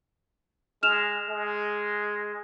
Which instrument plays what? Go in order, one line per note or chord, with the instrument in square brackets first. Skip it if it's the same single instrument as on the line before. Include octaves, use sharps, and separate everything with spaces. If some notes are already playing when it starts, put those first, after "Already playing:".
[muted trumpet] G#3 [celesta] F6 E7 F7
[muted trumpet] G#3